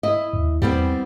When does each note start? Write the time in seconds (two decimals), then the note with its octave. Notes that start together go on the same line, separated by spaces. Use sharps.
0.03 E4 D#5
0.33 D#2
0.62 E2 G3 B3 C4